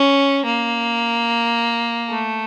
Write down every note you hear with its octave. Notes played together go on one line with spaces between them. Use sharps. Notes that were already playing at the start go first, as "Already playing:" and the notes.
Already playing: C#4
A#3
A3